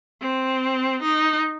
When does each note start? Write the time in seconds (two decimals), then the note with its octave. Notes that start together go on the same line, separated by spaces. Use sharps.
0.21 C4
1.03 D#4